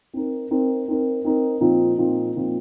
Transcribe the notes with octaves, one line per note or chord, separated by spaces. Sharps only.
C4 D#4 A#4
C4 D#4 A#4
C4 D#4 A#4
C4 D#4 A#4
A#2 F3 C4 D#4
A#2 F3 C4 D#4
A#2 F3 C4 D#4